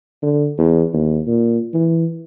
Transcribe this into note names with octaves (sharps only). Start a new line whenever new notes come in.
D3
E2
D#2
A#2
E3